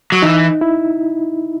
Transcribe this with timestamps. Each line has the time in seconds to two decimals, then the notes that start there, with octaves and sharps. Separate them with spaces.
0.12 F#3
0.22 E3 D#4
0.61 E4